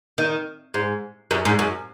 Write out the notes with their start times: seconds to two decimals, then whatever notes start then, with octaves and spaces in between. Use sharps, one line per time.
0.18 D#3
0.74 G#2
1.31 F#2
1.45 G#2
1.59 F#2